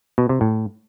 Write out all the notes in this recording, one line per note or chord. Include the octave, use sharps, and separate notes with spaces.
B2
C3
A2